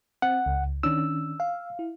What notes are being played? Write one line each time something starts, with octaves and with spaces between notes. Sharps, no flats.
C4 F#5
C#2
D#3 C#4 D4 E6
F5
E4